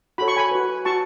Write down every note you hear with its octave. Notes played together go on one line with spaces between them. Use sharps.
F#4 A4 C#5 B5
C#6
G#5 B5
F#4 B4
F#4 A5 C#6